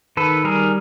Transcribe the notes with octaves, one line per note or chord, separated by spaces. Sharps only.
D#3 A4 B4
G3 G#4 A#4